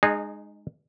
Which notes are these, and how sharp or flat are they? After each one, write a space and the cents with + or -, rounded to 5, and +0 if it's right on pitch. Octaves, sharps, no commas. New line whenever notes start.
G#3 +0 D#4 -30 G#4 +0